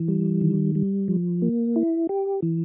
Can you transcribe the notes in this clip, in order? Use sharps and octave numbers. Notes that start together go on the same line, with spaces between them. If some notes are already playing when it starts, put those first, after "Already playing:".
Already playing: E3
G3
D#3
G3
F3
A#3
E4
G4
E3